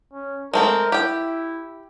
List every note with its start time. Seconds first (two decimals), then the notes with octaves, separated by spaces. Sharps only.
0.13 C#4
0.54 G#3 A3 C4 A#4
0.92 E4 G4 G5